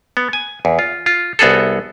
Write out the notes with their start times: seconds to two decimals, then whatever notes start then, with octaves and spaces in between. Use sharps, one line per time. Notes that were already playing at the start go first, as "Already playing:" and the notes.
0.17 B3
0.33 G#5
0.65 E2
0.79 F4
1.06 F4
1.39 C2 B3 F#4 G#4 A4